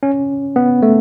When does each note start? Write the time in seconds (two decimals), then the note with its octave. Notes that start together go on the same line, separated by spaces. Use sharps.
0.03 C#4
0.56 B3
0.82 A3